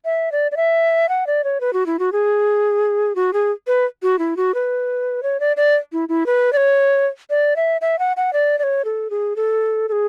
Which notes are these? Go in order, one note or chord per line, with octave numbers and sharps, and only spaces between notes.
E5
D5
D5
E5
F#5
D5
C#5
B4
F#4
E4
F#4
G#4
F#4
G#4
B4
F#4
E4
F#4
B4
C#5
D5
D5
E4
E4
B4
D5
C#5
D5
E5
E5
F#5
F#5
D5
D5
C#5
A4
G#4
A4
A4
G#4